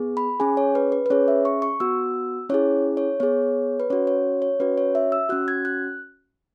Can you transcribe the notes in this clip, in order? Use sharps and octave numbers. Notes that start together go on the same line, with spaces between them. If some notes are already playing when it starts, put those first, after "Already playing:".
Already playing: B3 G#4
B5
C#4 G#4 G#5
C#5
B4
B4
B4
C#4 G#4 C#5
E5
C#6
C#6
B3 F#4 E6
C#4 E4 G#4 C#5
C#5
B3 G#4 C#5
B4
C#4 F#4 C#5
C#5
C#5
C#4 F#4 B4
C#5
E5
E6
C#4 F#4 F#6
G#6
F#6